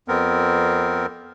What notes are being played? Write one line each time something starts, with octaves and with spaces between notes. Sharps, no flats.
F2 B3 C4 A#4